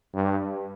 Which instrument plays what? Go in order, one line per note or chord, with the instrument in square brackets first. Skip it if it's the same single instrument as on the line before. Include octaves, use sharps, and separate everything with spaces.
[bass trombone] G2